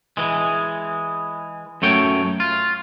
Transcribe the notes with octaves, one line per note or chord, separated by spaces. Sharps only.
E3 G#3
F#2 A3 C#5 G5
F4